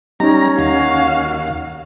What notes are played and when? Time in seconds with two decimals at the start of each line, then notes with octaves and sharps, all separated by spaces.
0.20 G3 C#4 D#4 A#5
0.59 D#2 F#4 F5